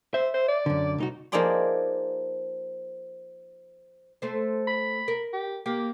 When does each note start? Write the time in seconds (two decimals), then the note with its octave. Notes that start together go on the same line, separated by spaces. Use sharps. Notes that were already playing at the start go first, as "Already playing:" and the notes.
0.14 C5 E5
0.34 C5
0.48 D5
0.66 F#2 D3
0.98 C2 D#4 F#4
1.32 F3 A#3 D#4 G#4 D5 C6
4.22 A3 C5
4.67 B5
5.08 A#4
5.33 G4
5.66 A#3 G4